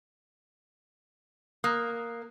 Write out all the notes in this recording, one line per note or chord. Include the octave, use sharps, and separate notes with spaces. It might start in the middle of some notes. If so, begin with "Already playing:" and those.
A#3 D#6 F#6